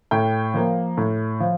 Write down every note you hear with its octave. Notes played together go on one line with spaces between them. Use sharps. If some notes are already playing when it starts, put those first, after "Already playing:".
A2 G5
F3 A#3
A2
F3